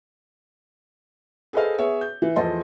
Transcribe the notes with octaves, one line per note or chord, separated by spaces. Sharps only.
G#4 A4 B4 C5 D#5 F5
B3 G#4 C#5 E5
G6
E3
E2 F3 A3 D#5 A5 C6